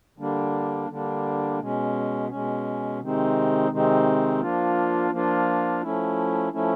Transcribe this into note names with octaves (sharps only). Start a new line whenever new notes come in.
D3 G3 A#3 D4
D3 G3 A#3 D4
B2 G#3 C#4
B2 G#3 C#4
C3 D#3 G#3 C4 D#4
C3 D#3 G#3 C4 D#4
F3 A#3 D4 F4
F3 A#3 D4 F4
F3 A3 C#4 E4
F3 A3 C#4 E4